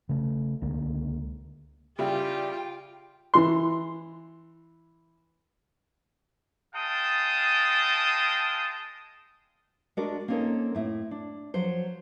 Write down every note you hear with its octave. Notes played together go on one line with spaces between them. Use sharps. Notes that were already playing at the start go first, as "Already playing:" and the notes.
C#3 A3
C#2 D3 G#3 A#3
C#3 G3 E4 F4 G4 G5
E3 C6
G#3 F5 G5 A5 D#6
G#3 D4 F#4 A#4 D5
A#3 C4 C#4 D#4 A4 A#4
A2 E4
D4
F3 F#3 C5